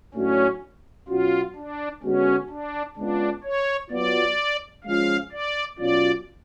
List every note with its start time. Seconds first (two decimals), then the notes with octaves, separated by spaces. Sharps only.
0.14 A2 F#3 A3 C#4 D4 F#4
1.08 B2 F#3 C#4 F4 F#4
1.55 D4
2.03 D3 G#3 B3 C#4 F#4
2.50 D4
2.96 C#3 G#3 B3 D4 F4
3.43 C#5
3.91 F#3 B3 F4 D5
4.84 C#3 F3 G#3 C#4 F4 F5
5.32 D5
5.78 B2 F#3 C#4 F4 D5